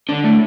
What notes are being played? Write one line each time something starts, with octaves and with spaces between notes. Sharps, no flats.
D3
A2